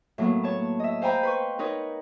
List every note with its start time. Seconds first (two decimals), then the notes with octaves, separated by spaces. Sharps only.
0.18 A2 F#3 A#3 B3
0.43 C#5 A5
0.80 D#5 E5
1.02 C5 F5 G5 G#5 A#5 B5
1.23 B4 C6 C#6
1.59 D#4 A#4 B4 C#5